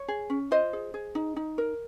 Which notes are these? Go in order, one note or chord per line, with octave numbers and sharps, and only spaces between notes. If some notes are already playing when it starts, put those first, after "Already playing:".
Already playing: C#5
G#4
C#4
F4 C5 D#5
G#4
G#4
D#4
D#4
A#4